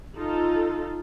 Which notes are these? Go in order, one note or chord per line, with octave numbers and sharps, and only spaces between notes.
D#4 F4 A4